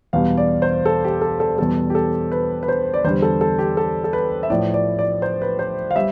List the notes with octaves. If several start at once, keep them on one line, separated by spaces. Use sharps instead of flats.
E2 B2 G3 F5
D5
C5
A4
G4
A4
A4
E2 B2 G3 A4
G4
A4
B4
B4
C5
D5
E2 D3 G3 C5
A4
A4
G4
A4
A4
B4
E5
A2 F3 A3 D5
D5
D5
C5
B4
C5
F5
G3 E5